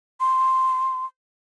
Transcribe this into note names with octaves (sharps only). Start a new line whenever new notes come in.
C6